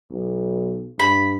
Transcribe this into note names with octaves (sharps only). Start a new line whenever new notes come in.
B1
G2 B5